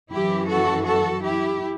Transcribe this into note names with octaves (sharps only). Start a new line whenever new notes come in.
F#2 E3 E4 G4
F#4 A4
F#4 A4
E4 G4